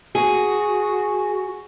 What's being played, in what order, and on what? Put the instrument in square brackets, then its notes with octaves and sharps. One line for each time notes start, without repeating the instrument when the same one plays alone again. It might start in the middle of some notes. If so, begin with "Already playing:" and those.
[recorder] F#4 [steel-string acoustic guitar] G#4